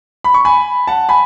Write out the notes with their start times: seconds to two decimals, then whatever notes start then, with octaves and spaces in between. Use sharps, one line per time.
0.24 B5
0.34 C#6
0.45 G#5 B5
0.87 F#5 A5
1.09 G#5 B5